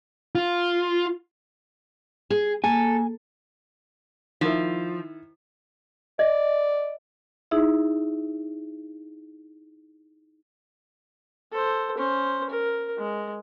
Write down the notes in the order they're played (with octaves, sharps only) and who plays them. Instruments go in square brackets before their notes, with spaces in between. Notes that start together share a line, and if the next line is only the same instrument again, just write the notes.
[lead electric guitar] F4
[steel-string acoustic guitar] G#4
[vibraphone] A#3 [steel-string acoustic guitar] A4 [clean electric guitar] G#5
[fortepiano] D#3 E4 [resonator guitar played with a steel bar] F3
[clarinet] D5 [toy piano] D#5
[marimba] D#4 E4 G#4 E5
[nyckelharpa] A4 C5
C#4 C5
A#4
G#3